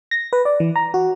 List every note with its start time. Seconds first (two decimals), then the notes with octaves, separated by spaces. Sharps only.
0.11 A#6
0.33 B4
0.45 D5
0.60 E3
0.76 A#5
0.94 F#4